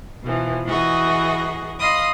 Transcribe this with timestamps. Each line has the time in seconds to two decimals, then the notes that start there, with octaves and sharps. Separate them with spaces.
0.24 B2 E3 F3
0.67 E3 F#4 G#4 D#5
1.79 D#5 F5 B5 C6 D#6